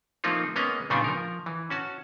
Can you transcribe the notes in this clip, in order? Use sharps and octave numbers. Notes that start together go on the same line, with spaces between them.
F3 A3 A#3 C4 D#4 F4
G#3 A#3 B3 C#4 D#5 A#5
A#2 C#3 G3 B3 D4 D#4
F3 A#4
E3
C#4 F#4 A5